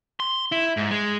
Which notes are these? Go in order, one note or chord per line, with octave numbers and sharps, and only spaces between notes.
C6
E4
G#2
G#3